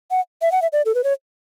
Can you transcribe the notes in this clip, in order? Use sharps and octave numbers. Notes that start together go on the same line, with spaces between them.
F#5
E5
F#5
E5
D5
A4
B4
C#5